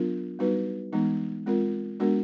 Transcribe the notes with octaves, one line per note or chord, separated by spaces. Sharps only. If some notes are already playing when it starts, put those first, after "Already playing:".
Already playing: F#3 B3 D4 F4 A#4
G3 B3 D#4 F#4 B4
E3 G#3 B3 D#4
G#3 C4 F4 A#4
G#3 B3 D4 F#4 A#4